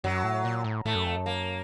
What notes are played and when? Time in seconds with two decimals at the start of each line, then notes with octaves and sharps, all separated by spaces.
0.04 F#2 F#3
0.24 A2
0.45 A#2
0.64 A2
0.85 A2 A3
0.95 F#2
1.06 F2
1.16 F#2
1.26 A#3